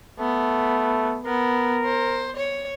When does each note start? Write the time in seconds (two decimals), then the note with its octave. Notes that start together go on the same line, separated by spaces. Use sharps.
0.20 A3 B3
1.26 B3 A#4
1.85 C5
2.37 C#5